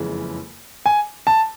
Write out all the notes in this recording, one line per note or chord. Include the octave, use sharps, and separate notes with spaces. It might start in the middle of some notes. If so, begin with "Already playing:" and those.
Already playing: F#1 F2 C#3 E3 G#3
G#5
A5